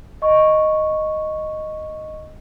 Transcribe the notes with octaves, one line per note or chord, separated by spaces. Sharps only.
D#5 C#6